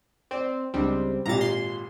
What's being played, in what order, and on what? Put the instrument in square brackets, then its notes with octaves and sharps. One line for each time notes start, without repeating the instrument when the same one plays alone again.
[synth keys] C4 [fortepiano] D5
[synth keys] C#2 G3 C4 [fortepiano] D4
[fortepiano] G#1 A#2 G4 [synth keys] A#5 A6
[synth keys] C6